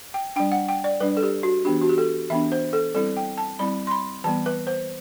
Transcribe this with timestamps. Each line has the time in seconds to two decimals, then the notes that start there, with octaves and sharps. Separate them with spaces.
0.14 G5
0.36 D4 G5
0.40 G3
0.52 F#5
0.69 G5
0.84 D5
1.00 G3 D4 B4
1.17 A4
1.23 G4
1.43 F#4
1.65 E3 B3 D4 G4
1.81 F#4
1.89 G4
1.98 A4
2.30 E3 B3 D4 E5
2.52 C5
2.73 A4
2.95 G3 C4 E4 A4
3.17 G5
3.37 A5
3.59 G3 C4 E4 B5
3.87 C6
3.91 B5
4.24 E3 G3 B3 A5
4.46 B4
4.67 C5